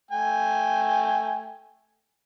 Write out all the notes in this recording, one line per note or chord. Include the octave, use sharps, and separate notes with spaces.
A3 G5 G#5